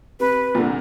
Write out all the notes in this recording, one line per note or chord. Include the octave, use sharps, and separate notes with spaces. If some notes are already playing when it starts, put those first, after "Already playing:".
C3 B4
C2 A#2 D3